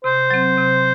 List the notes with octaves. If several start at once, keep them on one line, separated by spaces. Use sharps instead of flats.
C3 C5
F#3 C4
C3